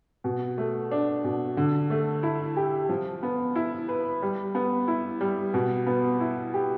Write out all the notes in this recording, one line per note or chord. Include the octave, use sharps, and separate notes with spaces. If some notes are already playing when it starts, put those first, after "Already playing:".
B2
A3
D4
B2
D3
A3
E4
G4
F3
B3
E4
B4
G3
B3
E4
G3
B2
B3
E4
G4